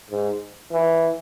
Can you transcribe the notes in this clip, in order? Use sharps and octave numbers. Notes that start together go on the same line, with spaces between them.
G#2
E3